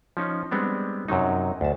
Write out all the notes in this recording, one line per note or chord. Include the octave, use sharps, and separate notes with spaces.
F3 C#4 D#4
G3 G#3 B3 C4 D4
F#2 C3 F#3 D#4
D2 A5